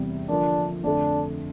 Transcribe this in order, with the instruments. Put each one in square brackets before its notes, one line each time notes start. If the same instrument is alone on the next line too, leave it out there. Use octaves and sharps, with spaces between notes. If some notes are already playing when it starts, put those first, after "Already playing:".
Already playing: [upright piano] E2 C3 E3 G3
[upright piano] D3 F3 A#3 [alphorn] D4
[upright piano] F2 D3 A3 [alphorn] D4